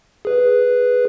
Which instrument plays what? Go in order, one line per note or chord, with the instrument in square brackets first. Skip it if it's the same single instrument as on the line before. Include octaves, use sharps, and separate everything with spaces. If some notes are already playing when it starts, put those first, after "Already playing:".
[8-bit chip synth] G#4 B4